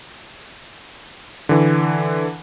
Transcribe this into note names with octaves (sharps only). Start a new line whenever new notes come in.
D3 E3